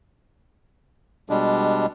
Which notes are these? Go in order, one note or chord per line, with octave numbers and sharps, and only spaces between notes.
B2 G3 G#3 D4